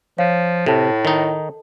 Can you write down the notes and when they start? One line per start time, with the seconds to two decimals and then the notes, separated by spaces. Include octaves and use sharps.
0.18 F3 C#5 F5
0.66 A2 C3 A4 A5
1.05 D#3 D#4